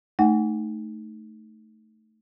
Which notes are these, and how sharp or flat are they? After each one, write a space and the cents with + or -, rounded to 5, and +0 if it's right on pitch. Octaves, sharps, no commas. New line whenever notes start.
A3 +0 D#4 +0 F#5 +5